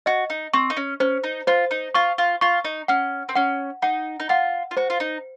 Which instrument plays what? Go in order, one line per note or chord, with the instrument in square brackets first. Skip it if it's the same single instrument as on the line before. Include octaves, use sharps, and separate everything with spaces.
[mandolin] F#4 [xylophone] D#5
[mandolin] D#4
[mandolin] C4 [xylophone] C#6
[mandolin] D#4
C#4
[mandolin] C#4 [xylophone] C5
[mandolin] D#4
[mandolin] F4 [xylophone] C5
[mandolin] D#4
[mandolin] F4 [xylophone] C#6
[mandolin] F4
[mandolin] F4 [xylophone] C#6
[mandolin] D#4
[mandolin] C#4 [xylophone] F#5
[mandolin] C4
[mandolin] C#4 [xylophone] F#5
[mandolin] D#4 [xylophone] F#5
[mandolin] D#4
[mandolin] F4 [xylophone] F#5
[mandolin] F4
[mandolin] F#4 [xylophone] C5
[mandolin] F4
D#4